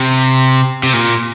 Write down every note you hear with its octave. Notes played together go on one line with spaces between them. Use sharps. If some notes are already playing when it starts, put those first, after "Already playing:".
Already playing: C3
C3
A#2